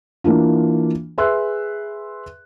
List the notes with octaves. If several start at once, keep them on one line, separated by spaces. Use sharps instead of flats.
E3 A#3 D4 F4
G#4 B4 E5 C6 E6 F#6